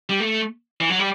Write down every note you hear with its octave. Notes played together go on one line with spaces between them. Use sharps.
G3
A3
E3
F#3
G3